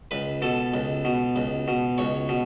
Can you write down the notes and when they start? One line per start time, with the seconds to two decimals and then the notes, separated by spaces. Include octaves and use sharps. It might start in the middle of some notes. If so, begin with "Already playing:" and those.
0.11 C#2 B4
0.42 B2 A4
0.74 C#2
1.05 B2
1.36 C#2
1.68 B2
1.98 C#2 C#5
2.29 B2